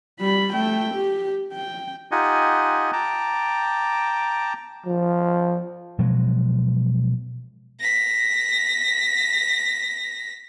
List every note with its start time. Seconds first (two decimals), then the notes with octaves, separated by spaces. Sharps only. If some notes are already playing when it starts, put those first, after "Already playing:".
0.20 G3 B5
0.53 A3 G5
0.95 G4
1.53 G5
2.11 D#4 F4 G4 D#5 F#5 G#5
2.93 G5 A5 A#5 D6
4.86 F3
5.99 B2 F3 F#3 G#3
7.80 A#6 B6